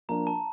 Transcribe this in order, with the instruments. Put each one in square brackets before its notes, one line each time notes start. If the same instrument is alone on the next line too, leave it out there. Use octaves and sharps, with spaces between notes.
[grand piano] F3 A#3 D4 [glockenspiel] A#5
[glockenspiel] A5